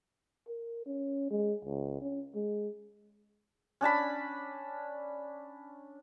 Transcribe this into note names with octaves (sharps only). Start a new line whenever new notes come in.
A#4
C#4
G#3
C#2
C#4
G#3
C#4 D4 A5 B5